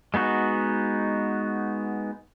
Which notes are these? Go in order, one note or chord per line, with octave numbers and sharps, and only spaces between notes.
G#3 B3 D#4 F#4